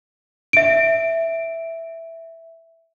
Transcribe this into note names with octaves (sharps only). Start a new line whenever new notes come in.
E5 D7